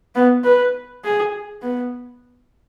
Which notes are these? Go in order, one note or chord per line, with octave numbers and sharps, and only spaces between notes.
B3
B4
G#4
B3